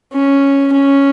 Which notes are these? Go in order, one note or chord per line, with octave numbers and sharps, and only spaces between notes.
C#4
C#4